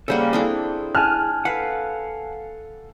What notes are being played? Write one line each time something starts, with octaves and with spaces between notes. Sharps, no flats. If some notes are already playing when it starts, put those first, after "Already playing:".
C#3 G3 A#3 A4 C5 F#5
C4 D4 E4 G#4 A4
G#5 A5 F6 F#6
A4 B4 F5 F#5